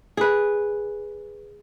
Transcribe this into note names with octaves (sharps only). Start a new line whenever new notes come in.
G#4 B4